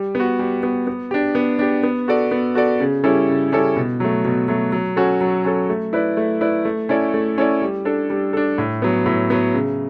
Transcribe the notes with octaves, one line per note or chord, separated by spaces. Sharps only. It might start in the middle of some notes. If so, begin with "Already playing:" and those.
Already playing: G3
B3 F#4
G3
B3 F#4
B3
D4 G4
B3
D4 G4
B3
F#4 A4 D5
B3
F#4 A4 D5
C#3
G3 C#4 E4 A4
C#3
G3 C#4 E4 A4
B2
F#3 A3
B2
F#3 A3
F#3
C#4 F#4 A4
F#3
C#4 F#4 A4
A3
E4 B4 D5
A3
E4 B4 D5
A3
C#4 E4 A4 D5
A3
C#4 E4 A4 D5
G3
D4 A4
G3
D4 A4
A2
F#3 B3
A2
F#3 B3
C#3